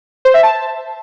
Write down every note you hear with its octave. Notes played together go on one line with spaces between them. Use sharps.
C5
E5
A5